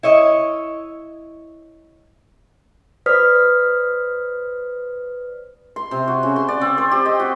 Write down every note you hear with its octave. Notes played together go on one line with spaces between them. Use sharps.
E4 C#5 D#5
B4 C5 D5 D#6 F6 B6
C6
C3
F#4
C#3
C6
D5
C4
C5
G4
D#5
F#4